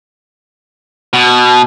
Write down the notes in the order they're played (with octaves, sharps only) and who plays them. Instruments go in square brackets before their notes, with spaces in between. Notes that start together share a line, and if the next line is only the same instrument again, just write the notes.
[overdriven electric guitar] B2